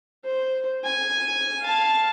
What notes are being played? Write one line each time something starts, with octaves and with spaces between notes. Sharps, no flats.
C5
G#5
F5 A5